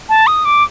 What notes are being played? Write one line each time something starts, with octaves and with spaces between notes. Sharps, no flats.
A5
D#6
D6